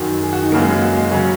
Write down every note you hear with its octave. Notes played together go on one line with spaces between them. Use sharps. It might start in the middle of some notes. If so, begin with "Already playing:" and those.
Already playing: F#2 D#3 F#3
G#4
F#4
D#4
F#2 C#3 F#3 A#3
G#3
A#3
F#4
G#3
C#3 F#3 C#4